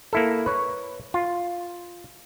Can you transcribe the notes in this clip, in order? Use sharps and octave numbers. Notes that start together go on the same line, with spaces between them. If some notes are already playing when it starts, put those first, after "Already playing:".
A#3 E4 A4
B4 C#5
F4